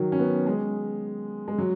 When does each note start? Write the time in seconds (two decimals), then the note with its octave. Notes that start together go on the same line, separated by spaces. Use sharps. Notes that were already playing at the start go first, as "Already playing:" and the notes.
Already playing: D#3 F#3
0.12 C#4
0.19 B3
0.47 G#3
1.48 G#3
1.58 F#3